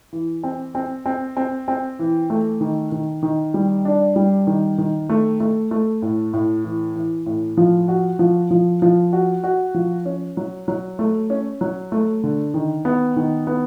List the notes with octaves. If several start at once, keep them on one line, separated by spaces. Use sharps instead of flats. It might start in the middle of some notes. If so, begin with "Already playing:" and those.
E3
C4
C4
C4
C4
C4
E3
A3
D#3
D#3
D#3
G3
D4
G3
D#3
D#3
A3
A3
A3
A2
A2
E3
E3
A2
F3
F#4
F3
F3
F3
F#4
F#4
F3
C#4
F#3
F#3
A3
C#4
F#3
A3
D3
D#3
B3
D#3
B3